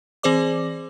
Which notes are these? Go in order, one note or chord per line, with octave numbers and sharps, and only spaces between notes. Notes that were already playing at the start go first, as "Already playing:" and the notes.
E3 C4 G#4 C5 D5 D6